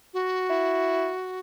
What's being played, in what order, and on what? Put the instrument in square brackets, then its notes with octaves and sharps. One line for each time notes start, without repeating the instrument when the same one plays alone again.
[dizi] F#4
[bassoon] E4